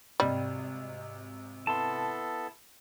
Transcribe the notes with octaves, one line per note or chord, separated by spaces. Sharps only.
G#1 C3 G3 D#5
B3 E4 A4 A5 C6